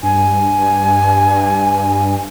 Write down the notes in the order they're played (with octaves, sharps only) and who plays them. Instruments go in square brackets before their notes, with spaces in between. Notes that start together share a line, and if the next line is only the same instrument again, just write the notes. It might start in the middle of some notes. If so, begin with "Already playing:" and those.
[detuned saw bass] G2 [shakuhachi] G#5